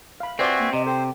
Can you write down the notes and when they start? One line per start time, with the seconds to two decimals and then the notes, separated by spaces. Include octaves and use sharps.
0.20 F5 B5
0.39 C4 F#4 B4 C5 D5 E5 G#5
0.59 A#3
0.73 C3 D#5
0.86 A4 C5 G5